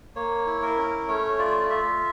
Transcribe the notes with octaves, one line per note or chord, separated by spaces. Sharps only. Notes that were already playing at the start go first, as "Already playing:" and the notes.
A#3 C#5
E4
A#4
C#4
A3 C#5
F4 D5
F4 E5